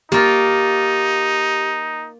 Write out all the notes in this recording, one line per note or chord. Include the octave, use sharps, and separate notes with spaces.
A#3 D#4 F4 G4